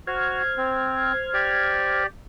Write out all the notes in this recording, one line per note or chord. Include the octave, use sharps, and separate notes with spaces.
F#4 C5 F6 G#6
C4
G4 D5